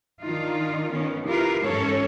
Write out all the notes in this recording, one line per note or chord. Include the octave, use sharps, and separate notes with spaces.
D#3 D4 D#4 F4
D#3 B3 C#4
E4 F4 G4 A#4 B4 F5
G#2 E3 C#4 A4 C#5